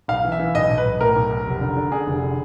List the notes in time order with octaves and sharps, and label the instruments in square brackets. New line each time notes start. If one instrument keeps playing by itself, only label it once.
[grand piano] B1 F5
E3
E5
E3
B1 D#5
B1
B4
B1
A2 A#4
B1
B1
F1
D3
D3
D3 G#4
F1
D3